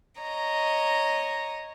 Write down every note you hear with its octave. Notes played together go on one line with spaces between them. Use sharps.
C#5 D#5 A#5